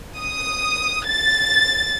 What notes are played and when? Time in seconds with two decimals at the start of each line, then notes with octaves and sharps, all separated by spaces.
0.19 D#6
1.06 A6